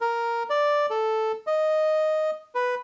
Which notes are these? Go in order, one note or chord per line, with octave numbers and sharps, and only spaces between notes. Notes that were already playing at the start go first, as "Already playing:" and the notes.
A#4
D5
A4
D#5
B4